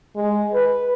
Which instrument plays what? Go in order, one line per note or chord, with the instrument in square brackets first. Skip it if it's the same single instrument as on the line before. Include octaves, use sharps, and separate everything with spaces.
[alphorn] G#3
B4